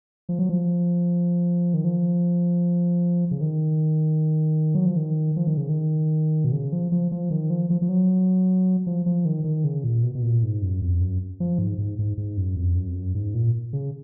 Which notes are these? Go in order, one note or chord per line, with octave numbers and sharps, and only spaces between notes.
F3
F#3
F3
D#3
F3
C#3
D#3
F#3
F3
D#3
F3
D#3
C#3
D#3
B2
C#3
F3
F3
F3
D#3
F3
F3
F3
F#3
F3
F3
D#3
D#3
C#3
A#2
B2
B2
A#2
G#2
F#2
F2
F#2
F3
G#2
G#2
G#2
G#2
F#2
F2
F#2
F2
F#2
G#2
A#2
C#3